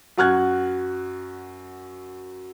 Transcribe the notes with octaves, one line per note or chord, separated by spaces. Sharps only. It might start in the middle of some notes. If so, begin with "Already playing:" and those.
F#2 F#4 F6 F#6 G#6